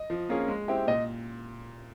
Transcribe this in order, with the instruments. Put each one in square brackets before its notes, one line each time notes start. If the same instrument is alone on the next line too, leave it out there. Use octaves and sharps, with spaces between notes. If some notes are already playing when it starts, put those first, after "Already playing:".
Already playing: [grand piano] D#5
[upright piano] F3
A#3 C#4 F4 G#4
G#3
C4 E4 G4
[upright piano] A#2 [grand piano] D#5